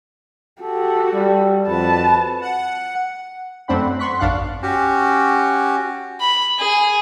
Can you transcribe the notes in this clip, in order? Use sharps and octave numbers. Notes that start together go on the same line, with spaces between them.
F#4 G4 A4
G3
F2 F#4 B4 A5
F#5
F#2 A3 C4 D4 F#5 B5
B3 C6 C#6 F#6 B6
A1 F#2 D4 F5 F#5 F#6
C#4 F#4 G4
B5
G#4